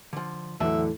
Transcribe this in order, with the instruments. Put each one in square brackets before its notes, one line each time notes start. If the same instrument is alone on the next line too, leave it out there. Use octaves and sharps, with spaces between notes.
[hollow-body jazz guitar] D3 F3
[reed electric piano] E2 E3 A4 [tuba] A2 [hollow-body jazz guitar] D3 F#3 A5 [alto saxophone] E5